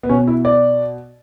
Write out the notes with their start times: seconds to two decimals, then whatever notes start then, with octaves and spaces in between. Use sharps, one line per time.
0.03 B3
0.09 B2 C#4
0.27 E4
0.45 D5